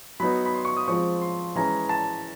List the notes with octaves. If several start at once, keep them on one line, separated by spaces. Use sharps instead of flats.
F#3 B3 D#4 B5
B5
C6
C#6
D#6
F3 G#3 C4 F4 C#6
C6
E3 G#3 C#4 A#5
A5